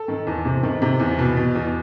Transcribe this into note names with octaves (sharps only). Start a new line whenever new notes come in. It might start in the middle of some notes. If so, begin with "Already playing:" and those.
Already playing: A4
D#3
E2
C3
D#3
C3
E2
B2
B2
E2